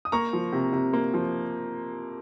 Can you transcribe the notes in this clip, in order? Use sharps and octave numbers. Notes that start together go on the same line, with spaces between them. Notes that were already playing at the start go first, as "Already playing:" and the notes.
D#6
A#3 A#5 C#6
F3
C3
C3
A#3
F3